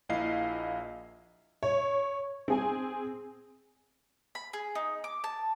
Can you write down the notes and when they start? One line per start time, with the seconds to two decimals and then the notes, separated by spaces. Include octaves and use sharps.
0.09 A#1 A#2 E4 D#5 F5 C7
1.63 C#5
2.48 C4 G#4 G#5
4.35 B5
4.53 G#4
4.75 D#4
5.04 D6
5.24 A5